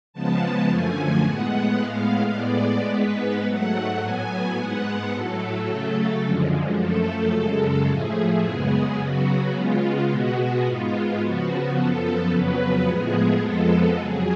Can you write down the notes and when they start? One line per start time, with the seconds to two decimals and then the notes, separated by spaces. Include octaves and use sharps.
0.13 C#3 F3 G#3 B3 A5
0.68 F#2 D3 F3 A3 G#5
1.24 A2 G#3 B3 F#5
1.79 A2 G#3 B3 F5
2.34 A2 G#3 B3 D5
2.90 G#2 G#3 B3 B4
3.45 G#2 F#3 A3 F#5
4.01 A2 F#3 B3 G#5
4.56 G#2 G#3 B3 F#5
5.11 A2 F#3 A3 A4
5.67 C#3 F#3 A3
6.22 F#2 D3 F3 G#3
6.77 F#2 F3 A3 A4
7.33 F#2 C#3 G#3
7.88 A2 F3 A3 G#4
8.43 F#2 C#3 G#3 B3 G#4
8.98 C#3 F#3 B3 F#4
9.54 C#3 G#3 B3 F4
10.09 B2 G#3 B3 F#4
10.65 G#2 G#3 B3 F4
11.20 C#3 F3 B3 F#4
11.76 F#2 F3 B3 A4
12.31 F2 C#3 F#3 B3 B4
12.86 A2 F3 G#3 B3 G#4
13.42 F2 F3 G#3 B3 A4
13.97 F2 C#3 F#3 G#4